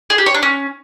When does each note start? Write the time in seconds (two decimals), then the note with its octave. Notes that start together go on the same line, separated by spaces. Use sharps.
0.10 G#4
0.18 G4
0.26 C#5
0.34 D4
0.43 C#4